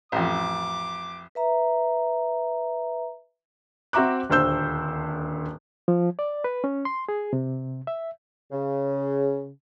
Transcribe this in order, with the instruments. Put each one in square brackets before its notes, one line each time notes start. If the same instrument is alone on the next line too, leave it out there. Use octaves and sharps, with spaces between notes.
[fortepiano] A1 F2 [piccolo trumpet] D6
[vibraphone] B4 E5 A#5
[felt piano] C4 F#4 E5 A#5 D6 F#6
D#1 D2 C5 E6 G6
[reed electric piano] F3
D5
B4
C#4
C6
G#4
C3
E5
[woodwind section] C#3